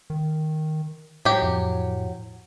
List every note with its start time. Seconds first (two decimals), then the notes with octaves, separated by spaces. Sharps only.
0.10 D#3
1.25 A2 F#3 G4
1.42 F2